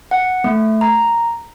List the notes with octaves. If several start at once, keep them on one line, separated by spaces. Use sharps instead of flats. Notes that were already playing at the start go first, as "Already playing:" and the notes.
F#5
A3
A#5